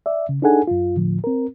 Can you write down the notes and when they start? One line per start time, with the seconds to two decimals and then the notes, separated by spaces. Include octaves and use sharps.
0.06 D5 E5
0.29 C#3
0.42 D4 D#4 G#4 A4 F#5 G#5
0.67 F#2 F4
0.96 A2 D3 F3
1.24 C4 A#4